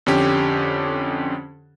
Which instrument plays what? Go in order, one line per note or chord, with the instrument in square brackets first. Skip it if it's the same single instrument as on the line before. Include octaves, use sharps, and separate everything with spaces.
[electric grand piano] F2 D3 C#4 G4